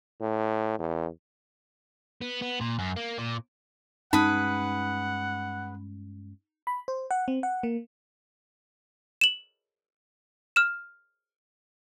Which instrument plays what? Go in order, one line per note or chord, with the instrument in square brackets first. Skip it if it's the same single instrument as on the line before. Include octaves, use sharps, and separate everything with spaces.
[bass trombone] A2
E2
[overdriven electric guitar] B3
B3
A#2
F#2
A#3
A#2
[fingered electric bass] G2 G#3 C#4 [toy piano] D#4 [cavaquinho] G#4 B4 B5 [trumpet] F#5
[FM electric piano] B5
C5
F#5
C4
F#5
A#3
[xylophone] E7 F#7
F6 E7